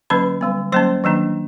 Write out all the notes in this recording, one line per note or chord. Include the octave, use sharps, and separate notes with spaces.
D3 F#3 A#3 C#4 B4 B5
D3 G3 B3
F#3 A#3 C#4 C5 C6
D#3 F#3 A#3 D4